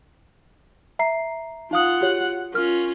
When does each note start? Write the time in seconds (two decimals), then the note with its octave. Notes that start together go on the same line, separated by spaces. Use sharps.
0.99 E5 A#5 C7
1.71 D#4 F4 F5 F#5 D#6
2.01 F#4 G4 C#5
2.54 C#4 F4 A#4 F6